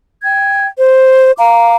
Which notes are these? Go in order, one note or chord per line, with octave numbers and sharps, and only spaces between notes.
G5 G#6
C5
F5 A#5 D6